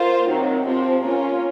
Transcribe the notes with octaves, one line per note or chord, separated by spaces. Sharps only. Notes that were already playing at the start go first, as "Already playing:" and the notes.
Already playing: A#3 F4 C5
C3 D#3 F#3
C3 F3 C4
A#3 C#4 F4